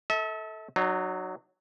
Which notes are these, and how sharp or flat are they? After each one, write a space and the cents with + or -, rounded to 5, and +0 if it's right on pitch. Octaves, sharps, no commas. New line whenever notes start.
A4 +0 E5 -40
F#3 +0 D#4 -40